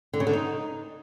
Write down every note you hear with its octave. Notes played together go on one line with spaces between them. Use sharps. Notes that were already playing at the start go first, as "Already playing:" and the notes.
D3
C#3
D3
D#4